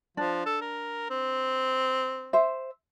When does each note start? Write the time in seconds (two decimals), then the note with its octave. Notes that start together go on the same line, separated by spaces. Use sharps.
0.17 F3 D4
0.46 A4
0.61 A#4
1.10 C4
2.33 C5 E5